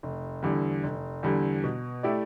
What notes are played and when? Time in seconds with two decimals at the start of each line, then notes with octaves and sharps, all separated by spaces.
0.03 F1
0.43 E2 D3 G3
0.84 F1
1.23 E2 D3 G3
1.64 B2
2.03 A3 E4 G4 D5